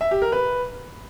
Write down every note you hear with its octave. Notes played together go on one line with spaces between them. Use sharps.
E5
G4
A#4
B4